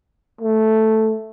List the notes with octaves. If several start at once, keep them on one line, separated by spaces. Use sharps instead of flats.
A3